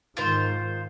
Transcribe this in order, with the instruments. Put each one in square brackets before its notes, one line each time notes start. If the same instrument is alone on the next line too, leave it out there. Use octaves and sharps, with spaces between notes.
[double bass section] G#2 D#3 [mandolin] F4 C5